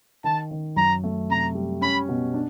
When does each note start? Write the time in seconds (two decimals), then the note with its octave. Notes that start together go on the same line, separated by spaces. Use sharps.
0.24 D#3 A5
0.51 D#3
0.76 F#2 A#5
1.04 A3
1.29 C3 A#5
1.55 G3
1.81 C#4 B5
2.09 B2
2.34 D4